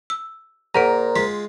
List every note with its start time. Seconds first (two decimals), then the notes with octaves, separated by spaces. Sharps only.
0.10 E6
0.75 A#2 G#4 A#4 C5 F#5 A#5 D7
1.16 G#3 F4 B6